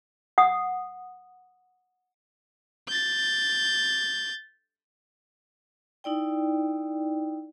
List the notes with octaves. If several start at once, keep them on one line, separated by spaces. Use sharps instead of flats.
F#5 D#6
G6 A6
D#4 E4 D5 G5